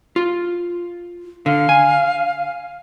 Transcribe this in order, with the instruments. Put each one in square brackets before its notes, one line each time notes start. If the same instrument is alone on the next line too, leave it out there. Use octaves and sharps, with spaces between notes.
[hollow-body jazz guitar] F4
[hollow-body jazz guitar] D3 [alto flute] F5
[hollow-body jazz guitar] G#5